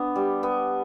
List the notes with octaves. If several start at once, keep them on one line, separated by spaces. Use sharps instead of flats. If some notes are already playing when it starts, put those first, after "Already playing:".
Already playing: B3 D4
G3
B3